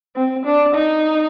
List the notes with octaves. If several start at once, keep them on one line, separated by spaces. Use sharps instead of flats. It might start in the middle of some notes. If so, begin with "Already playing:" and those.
C4
D4
D#4